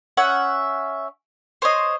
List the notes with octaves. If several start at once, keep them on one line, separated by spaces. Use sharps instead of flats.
C#4 E5 F#5
C5 C#5 D#5